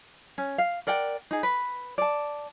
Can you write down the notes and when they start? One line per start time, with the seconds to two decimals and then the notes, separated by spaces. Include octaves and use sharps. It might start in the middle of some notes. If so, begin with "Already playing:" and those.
0.38 C#4
0.58 F5
0.87 A#4 D5 F#5 G5
1.31 D#4 G#4
1.43 B4
1.98 D5 A5